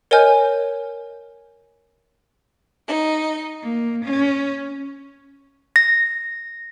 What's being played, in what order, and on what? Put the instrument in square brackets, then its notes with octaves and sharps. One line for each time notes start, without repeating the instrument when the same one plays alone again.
[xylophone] A#4 C#5 D#5 G#5 F6 G6
[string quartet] D#4
A#3
C#4
[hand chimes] A#6